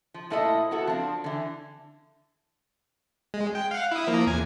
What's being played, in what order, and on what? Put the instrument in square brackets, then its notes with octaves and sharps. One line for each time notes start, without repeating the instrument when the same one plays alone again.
[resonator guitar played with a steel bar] F3
A#2 A3 E4 A4 C5 D#5
B3 E4 F#4 A4
F3 C4 D4
D3 E3
[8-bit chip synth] G#3
G5
F5 F#5
E4 D#6
F3 A#3 A#4
E2 G#5